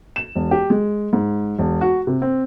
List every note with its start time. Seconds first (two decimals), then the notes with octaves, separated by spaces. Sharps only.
0.16 E7
0.35 E1
0.51 G4
0.70 G#3
1.13 G#2
1.59 E1
1.81 F#4
2.07 C3
2.22 C4